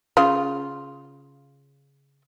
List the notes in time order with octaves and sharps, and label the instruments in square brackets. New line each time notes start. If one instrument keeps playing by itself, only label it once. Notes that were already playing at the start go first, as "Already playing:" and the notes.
[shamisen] C#3 F4